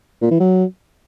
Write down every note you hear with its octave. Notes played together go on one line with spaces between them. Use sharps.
A#2
E3
F#3